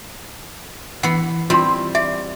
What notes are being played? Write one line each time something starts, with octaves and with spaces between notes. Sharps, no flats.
E3 B3 F#5
G3 C4 E4 F4 C6
D5 E5